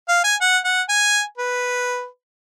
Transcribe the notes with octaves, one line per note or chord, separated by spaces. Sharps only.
F5
G#5
F#5
F#5
G#5
B4